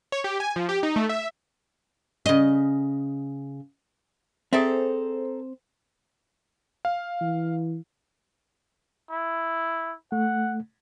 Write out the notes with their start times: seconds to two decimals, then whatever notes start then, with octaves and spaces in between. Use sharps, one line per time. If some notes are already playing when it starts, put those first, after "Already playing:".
0.12 C#5
0.24 G4
0.40 G#5
0.56 F3
0.69 G4
0.83 D#4
0.96 A3
1.09 E5
2.26 C#3 D#5
4.53 C4 G#4 A4 C5 D5 E5 A#5
6.85 F5
7.21 E3
9.11 E4
10.12 A3 F#5